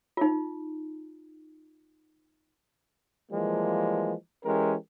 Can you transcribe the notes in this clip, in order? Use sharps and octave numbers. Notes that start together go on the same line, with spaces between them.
D#4 F4
E3 F3 G3 G#3 A#3
E3 G#3 C#4 G4 A#4